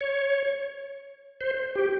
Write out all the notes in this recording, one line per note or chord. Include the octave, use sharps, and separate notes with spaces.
C#5
C5
G4